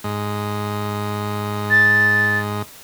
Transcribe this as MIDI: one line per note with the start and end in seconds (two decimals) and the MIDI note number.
0.04 2.62 44
0.04 2.62 56
1.71 2.39 93